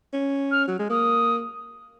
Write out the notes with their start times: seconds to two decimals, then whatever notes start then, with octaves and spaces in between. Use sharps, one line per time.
0.13 C#4
0.51 F6
0.68 F#3
0.79 G#3
0.90 A#3 D#6